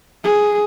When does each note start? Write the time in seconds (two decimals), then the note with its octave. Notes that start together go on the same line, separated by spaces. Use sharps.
0.24 G#4